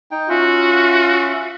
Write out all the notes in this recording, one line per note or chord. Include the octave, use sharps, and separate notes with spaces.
D#4 G5
C#4 F4 F#4 E5